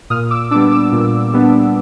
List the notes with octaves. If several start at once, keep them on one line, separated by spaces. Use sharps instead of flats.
A#2 D#6 F6
D6 E6
G3 B3 D4 D6 E6
D6 E6
A#2
G3 B3 D4